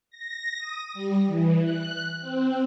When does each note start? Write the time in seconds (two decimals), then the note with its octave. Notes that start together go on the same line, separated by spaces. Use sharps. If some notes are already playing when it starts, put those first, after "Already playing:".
0.10 A#6
0.58 D#6
0.94 G3
1.27 E3
1.63 F#6
2.21 C4